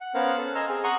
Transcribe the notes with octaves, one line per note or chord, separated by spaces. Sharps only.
F#5
B3 C#4 A#4 C5 F5 F#5
A4
D#5 G#5 A#5 C6 E6 F6
C4 G#4 G#5
F#5 A#5 C6 C#6 D#6